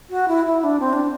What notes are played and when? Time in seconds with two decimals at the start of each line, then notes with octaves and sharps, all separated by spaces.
0.10 F#4
0.28 E4
0.45 E4
0.63 D4
0.80 C4
0.93 D4